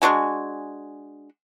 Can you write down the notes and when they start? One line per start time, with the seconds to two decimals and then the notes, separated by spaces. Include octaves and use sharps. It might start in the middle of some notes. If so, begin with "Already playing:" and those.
0.02 G#3 D4 F#4 G#5